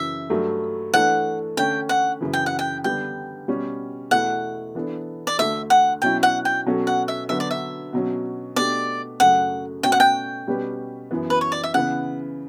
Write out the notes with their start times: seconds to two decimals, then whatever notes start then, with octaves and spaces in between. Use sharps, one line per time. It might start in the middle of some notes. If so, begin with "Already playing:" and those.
Already playing: F#2 C#3 E3 E5
0.30 G2 F#3 A3
0.94 E3 A3 D4 A4 F#5
1.57 D3 A3 C#4 G5
1.89 F#5
2.21 F#2 C#3 E3
2.33 G5
2.46 F#5
2.59 G5
2.84 D3 G3 B3 G5
3.48 B2 G3 C#4 F#4
4.11 E2 B2 A3 E4 F#5
4.75 E3 B3 D4 A4
5.27 D5
5.39 D2 D3 A3 E5
5.70 F#5
6.02 B2 F#3 C#4 E4 G5
6.23 F#5
6.45 G5
6.66 B2 F#3 C#4 F#4 A4
6.87 F#5
7.08 E5
7.29 D3 F#3 B3 F#4 E5
7.40 D5
7.51 E5
7.93 B2 F#3 C#4
8.56 B2 A3 D4 G4 D5
9.20 F#2 C#3 F#3 A3 F#5
9.83 B2 A3 C#4 F#4 A4 G5
9.92 F#5
10.00 G5
10.47 B2 G3 C#4 G4 B4
11.11 F#2 E3 B3
11.30 B4
11.41 C#5
11.52 D5
11.63 E5
11.74 C#3 E3 B3 F#5